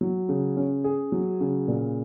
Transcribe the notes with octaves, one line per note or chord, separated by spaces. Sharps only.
F#3
C#3
C#4
G#4
F#3
C#3
A#2